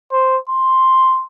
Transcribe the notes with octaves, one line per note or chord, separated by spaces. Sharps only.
C5
C6